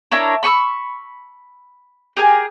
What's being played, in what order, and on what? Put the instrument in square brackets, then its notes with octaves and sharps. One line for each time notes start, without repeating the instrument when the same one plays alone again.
[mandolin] D4 E4 A#4 C#5
B5 C#6 D#6 E6
G4 G#4 A#4 G#5